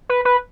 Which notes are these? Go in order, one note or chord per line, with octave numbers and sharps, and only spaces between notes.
B4
B4